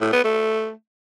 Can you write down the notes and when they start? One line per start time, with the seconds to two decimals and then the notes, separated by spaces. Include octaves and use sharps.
0.01 A2
0.12 B3
0.24 A3